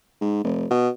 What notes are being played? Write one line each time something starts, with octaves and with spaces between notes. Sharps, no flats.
G#2
F1
B2